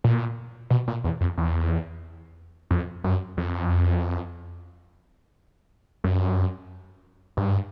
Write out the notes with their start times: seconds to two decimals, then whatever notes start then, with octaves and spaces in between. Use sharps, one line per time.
0.04 A#2
0.70 B2
0.88 A#2
1.04 E2
1.21 F2
1.38 E2
2.71 F2
3.04 F#2
3.37 F2
6.04 F#2
7.37 G2